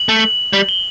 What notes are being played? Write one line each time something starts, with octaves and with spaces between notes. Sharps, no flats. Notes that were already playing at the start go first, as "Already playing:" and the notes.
Already playing: F#7
A3
G3
G7